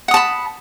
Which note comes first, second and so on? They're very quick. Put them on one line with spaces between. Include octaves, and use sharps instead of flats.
F#5 D#6 A5 B5